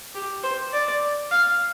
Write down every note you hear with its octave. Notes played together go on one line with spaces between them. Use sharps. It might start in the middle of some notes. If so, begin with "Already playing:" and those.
G4
C5
D5
F5